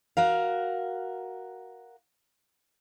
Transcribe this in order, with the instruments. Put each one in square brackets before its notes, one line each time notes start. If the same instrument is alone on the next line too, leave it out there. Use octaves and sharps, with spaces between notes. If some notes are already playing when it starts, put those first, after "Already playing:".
[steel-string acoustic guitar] F#4 A#4 F5